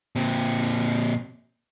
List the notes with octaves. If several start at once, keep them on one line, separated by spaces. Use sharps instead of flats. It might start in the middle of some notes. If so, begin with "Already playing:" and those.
A#2 C4